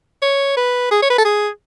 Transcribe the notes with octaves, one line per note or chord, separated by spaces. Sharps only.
C#5
B4
G#4
C#5
B4
A4
G#4